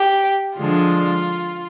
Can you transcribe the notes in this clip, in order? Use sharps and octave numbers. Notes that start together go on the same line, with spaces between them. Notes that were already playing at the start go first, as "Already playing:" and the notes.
Already playing: G4
D3 F3 G#3 D4 F4